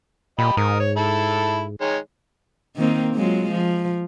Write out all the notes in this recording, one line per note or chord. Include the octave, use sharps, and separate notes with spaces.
A#2 G4 D#5 B5
G#2 A#4 D#6
C#5
E4 A4
D#3 G#3 C#5
D#3 A#3 C4
F#3 G#3 F4
F3